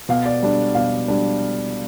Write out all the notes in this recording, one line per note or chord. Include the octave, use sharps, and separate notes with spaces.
B2 F5
D5
G3 D4
B2 F5
G3 D4